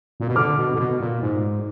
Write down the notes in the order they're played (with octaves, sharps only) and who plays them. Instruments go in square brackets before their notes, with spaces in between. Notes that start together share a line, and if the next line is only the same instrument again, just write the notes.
[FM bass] A#2
B2
[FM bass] D3 [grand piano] D6 F6
[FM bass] B2
D3
B2
A#2
G#2